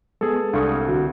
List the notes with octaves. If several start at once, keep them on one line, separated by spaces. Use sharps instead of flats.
G#3 B3 G#4 A4
C2 D4 A4 F5 C#6 D#6
D3 C4 F#4